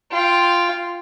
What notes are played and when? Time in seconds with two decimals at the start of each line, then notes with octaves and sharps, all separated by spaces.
0.11 F4 G5